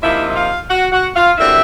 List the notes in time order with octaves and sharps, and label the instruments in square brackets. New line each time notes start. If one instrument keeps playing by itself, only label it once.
[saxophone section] C3 F3 A#3 D#4 E4 E5
E5
F4 F5
F#4 F#5
F#4 F#5
F4 F5
F#2 D3 G3 C4 E4 E5